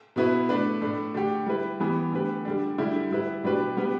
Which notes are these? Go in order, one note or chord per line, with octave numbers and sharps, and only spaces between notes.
B2 B3 E4 B4
A3 D4 B4
A2 A3 D4
D3 A3 D4 G4
G3 E4 B4
E3 G3 B3
D3 A3 G4 B4
D3 G3 D4
D3 G3 E4 G4
G3 E4 B4
B2 G3 D4 G4 B4
G3 B3 G4 B4